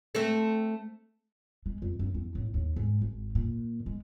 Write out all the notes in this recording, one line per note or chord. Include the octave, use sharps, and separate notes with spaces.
A3 C4 A4
G#3
F2
F#2
E2
A1
D#2
G#2
G#1
A#2
G#3